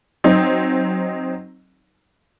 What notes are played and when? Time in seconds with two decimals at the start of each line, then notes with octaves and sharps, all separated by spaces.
0.24 F#3 C4 D#4